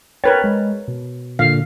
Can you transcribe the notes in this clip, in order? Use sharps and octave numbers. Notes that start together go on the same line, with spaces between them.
A#4 B4 C#5 G5 A6
G#3
B2
A#2 D3 F5